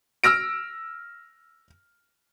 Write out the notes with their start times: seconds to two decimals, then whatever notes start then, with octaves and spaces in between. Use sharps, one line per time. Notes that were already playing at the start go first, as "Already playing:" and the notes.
0.24 E6 F6 A#6 D7